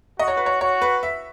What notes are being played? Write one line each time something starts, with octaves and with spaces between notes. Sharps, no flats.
F#4 D#5
C#5
B4
C#5
F#4 C#5
B4
E5